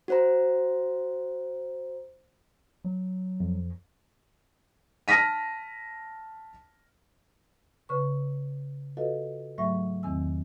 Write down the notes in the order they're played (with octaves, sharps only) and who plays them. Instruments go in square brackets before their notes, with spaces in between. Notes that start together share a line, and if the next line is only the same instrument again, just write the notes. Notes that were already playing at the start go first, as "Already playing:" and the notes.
[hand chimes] F#4 C5 A#5
[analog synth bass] F#3
[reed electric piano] F2
[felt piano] A5 F6 A#6 B6 D#7
[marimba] C#3 B4 C#6
F4 F#4 A4 B4 D#5 F5
G#2 F#3 A3 E5 C#6
E2 D#3 C4 G#5 E6